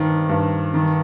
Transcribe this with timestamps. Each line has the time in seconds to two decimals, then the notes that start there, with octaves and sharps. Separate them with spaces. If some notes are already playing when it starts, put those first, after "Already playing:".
Already playing: G2 D#3 C4
0.29 G2
0.74 D#3